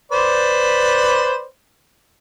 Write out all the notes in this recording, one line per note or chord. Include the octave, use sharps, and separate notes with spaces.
B4 C5 D5